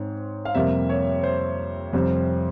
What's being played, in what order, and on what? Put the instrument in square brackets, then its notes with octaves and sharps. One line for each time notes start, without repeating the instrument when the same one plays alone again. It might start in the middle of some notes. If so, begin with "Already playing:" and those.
Already playing: [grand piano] G#2 C4 C#5
F5
F2 C3 G3 A#3 E5
C#5
C5
F2 C3 G3 C4